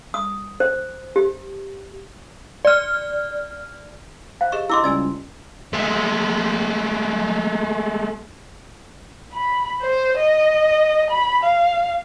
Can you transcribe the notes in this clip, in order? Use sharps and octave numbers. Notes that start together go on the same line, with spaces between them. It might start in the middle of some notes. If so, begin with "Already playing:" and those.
D#6
C5
G4
D5 F6
C5 F5 F#6
G4 G#4 D#5 C#6
E4 D#5 C6 D6 E6
C#2 G3 D5 G#5 E6 A6
G#3 A3
B5
C5
D#5
B5
F5